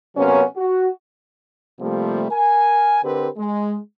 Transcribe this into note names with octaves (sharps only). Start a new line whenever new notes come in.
C3 F#3 A#3 B3 C#4
F#4
C3 F3 G3 A3 A#3
A#4 G#5
D3 C4 G4 A#4 B4
G#3